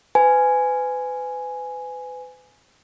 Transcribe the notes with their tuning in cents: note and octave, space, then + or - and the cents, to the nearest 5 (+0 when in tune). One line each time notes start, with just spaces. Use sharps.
B4 +35 G#5 +0